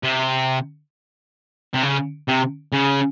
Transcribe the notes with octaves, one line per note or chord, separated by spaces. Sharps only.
C3
C3
C#3
C3
C#3